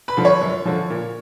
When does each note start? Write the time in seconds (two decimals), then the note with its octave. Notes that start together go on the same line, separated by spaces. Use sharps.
0.08 B4 B5
0.17 D3 F3
0.25 C#5 C#6
0.41 F#2
0.65 D3 F3
0.90 A#2